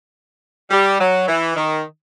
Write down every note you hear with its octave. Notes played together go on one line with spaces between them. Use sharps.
G3
F#3
E3
D#3